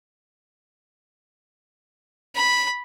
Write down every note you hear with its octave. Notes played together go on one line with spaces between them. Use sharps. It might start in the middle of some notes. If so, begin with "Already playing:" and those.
B5